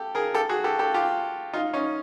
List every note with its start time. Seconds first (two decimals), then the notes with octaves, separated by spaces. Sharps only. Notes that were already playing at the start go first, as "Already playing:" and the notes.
Already playing: G4 A4
0.15 G#4 A#4
0.35 G4 A4
0.49 F#4 G#4
0.64 G4 A4
0.79 G4 A4
0.94 F4 G4
1.53 D#4 F4
1.73 C#4 D#4